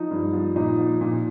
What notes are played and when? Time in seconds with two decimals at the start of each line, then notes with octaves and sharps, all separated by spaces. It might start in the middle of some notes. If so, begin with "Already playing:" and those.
Already playing: F3 D#4
0.11 G2
0.33 F3
0.56 A#2 D#4
0.79 F3
1.01 A#2